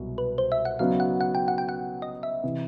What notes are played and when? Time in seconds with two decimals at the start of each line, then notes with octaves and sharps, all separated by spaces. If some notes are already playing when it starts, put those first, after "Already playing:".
Already playing: C2 B2 F#3
0.18 B4
0.38 C5
0.52 E5
0.65 F#5
0.79 C#3 F#3 B3 D#4 F#4 F5
1.00 F#5
1.21 F#5
1.35 G5
1.48 F#5
1.58 G5
1.69 F#5
2.02 D#5
2.23 E5
2.43 C3 E3